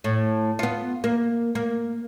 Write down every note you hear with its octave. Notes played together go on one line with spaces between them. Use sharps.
A2
B3 F4
A#3
A#3